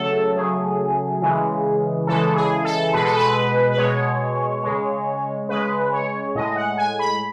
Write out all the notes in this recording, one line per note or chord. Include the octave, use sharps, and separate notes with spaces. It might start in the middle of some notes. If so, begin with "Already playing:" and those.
Already playing: C#3 F#3 A3 A4
C#3 F#3 A3 G#4
C#3 E3 G#3
C#3 E3 G#3 A4
G#4
A4
B2 G#3 B4
A4
B4
B4
B2 G#3 C#5
C#3 G#3
C#3 G#3 B4
C#5
A2 G#3 D#5
F#5
G#5
B5